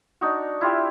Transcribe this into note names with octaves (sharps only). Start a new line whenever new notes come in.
D4 D#4 F#4
E4 F4 G4 E5